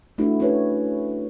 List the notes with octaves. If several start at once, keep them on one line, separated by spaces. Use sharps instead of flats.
A3 D4 E4 F#4
C#4 E4 F#4 B4 C#5